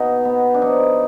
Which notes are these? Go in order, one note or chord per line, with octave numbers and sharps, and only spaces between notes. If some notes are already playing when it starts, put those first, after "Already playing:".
Already playing: B2 D#4
B3
D4
F3 D#4